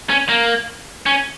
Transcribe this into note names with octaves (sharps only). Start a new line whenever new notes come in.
C#4
A#3
C#4